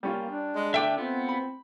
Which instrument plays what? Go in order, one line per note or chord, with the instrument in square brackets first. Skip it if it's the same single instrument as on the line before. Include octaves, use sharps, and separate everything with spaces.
[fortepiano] G3 C#4 F4 [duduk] A#3
[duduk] D4
[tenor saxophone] G#3
[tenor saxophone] D3 [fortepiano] A3 [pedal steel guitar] E5 G5 D6
[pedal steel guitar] B3 [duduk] C4 [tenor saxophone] F4
[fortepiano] B5